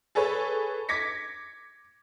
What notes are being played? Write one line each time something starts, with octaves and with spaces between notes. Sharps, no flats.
G#4 A4 B4 C#5
D6 G#6 A#6 B6 C#7